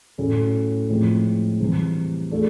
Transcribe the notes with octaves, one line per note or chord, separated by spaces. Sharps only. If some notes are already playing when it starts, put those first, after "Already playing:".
A2 F#3 A3 C#4
A2 F3 G#3 C4
C3 E3 G3
A3 D4 F4 G#4